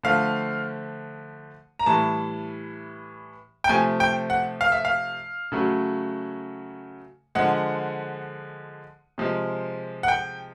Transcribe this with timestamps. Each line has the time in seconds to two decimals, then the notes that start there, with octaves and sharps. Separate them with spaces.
0.03 D3 F3 A3 F5
1.79 A#5
1.86 A2 E3 G3 A5
3.64 G5
3.69 C3 F3 A3 G#5
4.00 G5
4.30 F#5
4.61 F5
4.72 E5
4.85 F5
5.52 C#3 F#3 A3
7.35 D3 F3 G#3 F#5
9.18 C3 F3 G#3
10.03 F#5
10.08 G5